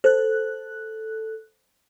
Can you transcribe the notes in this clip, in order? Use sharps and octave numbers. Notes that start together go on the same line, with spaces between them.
A4 C5 F#6